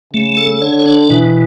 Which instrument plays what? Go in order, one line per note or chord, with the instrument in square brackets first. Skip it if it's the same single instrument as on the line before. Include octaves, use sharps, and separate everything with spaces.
[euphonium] C#3 [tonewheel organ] A3
[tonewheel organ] A4
[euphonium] D3 [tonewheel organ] C#5
[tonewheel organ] D4
[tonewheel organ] B2 [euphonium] E3